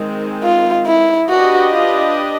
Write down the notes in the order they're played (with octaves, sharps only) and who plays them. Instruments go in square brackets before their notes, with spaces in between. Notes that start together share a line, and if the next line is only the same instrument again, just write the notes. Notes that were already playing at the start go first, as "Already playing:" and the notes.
Already playing: [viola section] D#3 G#3 C4
[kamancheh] F4
E4
[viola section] D4 G4 B4 D#5 [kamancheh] F#4
[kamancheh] F4